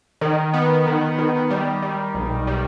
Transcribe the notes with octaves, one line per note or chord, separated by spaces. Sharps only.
D#3
B3
D#3
D#3
G3
G3
B1
G3